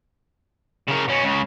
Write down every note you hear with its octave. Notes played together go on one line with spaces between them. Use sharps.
C#3 A#4
B2 C#4
C#2 C#3